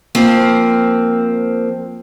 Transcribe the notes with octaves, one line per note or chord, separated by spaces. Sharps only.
F3 A#3 C4